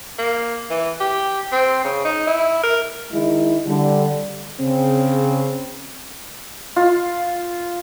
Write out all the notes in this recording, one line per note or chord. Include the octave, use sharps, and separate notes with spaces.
A#3
E3
G4
C4
C#3
D#4
E4
A#4
D#3 G#3 E4
D3 G3
C#3 C4
F4